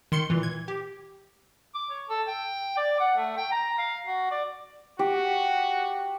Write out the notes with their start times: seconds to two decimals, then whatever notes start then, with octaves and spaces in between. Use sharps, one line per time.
0.12 D#3 C6 C#7
0.30 A#2 E3
0.43 G#6
0.68 G4
1.75 D6
1.91 C#5
2.09 A4
2.28 G5
2.77 D5
3.00 F#5
3.17 A3
3.37 G5
3.52 A#5
3.78 F5
4.06 F#4
4.31 D5
4.99 F#4 G4